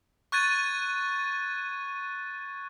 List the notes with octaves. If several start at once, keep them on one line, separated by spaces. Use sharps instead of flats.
C#6 F#6 G#6 A6 D#7